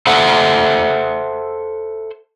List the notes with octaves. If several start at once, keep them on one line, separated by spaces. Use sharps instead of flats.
A4 C5 E5 F#5